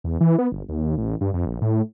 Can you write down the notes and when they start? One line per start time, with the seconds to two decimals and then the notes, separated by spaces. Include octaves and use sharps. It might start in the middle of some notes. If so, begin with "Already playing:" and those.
0.04 E2
0.21 E3
0.38 B3
0.52 G1
0.69 D#2
0.98 A1
1.21 G2
1.34 F2
1.46 A#1
1.61 A2